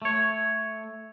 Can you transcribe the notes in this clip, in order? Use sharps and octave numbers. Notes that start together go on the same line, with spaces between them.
A3 C#5